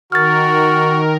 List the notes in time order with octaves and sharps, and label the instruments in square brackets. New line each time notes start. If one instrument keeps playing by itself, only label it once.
[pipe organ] D#3 A#4 [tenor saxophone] F#4 [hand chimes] F6 A6